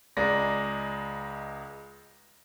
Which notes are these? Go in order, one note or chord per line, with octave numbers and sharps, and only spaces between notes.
C#2 G#3 D5 A#5 A#6